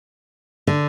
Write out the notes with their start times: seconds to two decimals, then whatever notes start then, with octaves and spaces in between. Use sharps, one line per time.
0.67 D3